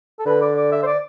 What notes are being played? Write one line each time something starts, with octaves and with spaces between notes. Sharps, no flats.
A4
D3 B4
D5
D5
E5
C5
D5